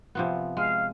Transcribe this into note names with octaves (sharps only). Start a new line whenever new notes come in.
C3 F3 B3
G#3 F5